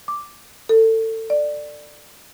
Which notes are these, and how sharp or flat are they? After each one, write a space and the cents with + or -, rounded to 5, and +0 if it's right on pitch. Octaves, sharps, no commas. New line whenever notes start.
D6 +0
A4 +25
D5 +10